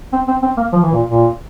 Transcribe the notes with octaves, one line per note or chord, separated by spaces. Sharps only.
C4
C4
C4
A#3
F3
E3
A#2
A#2